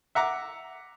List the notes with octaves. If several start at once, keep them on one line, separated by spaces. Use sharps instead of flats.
E5 F#5 A#5 D6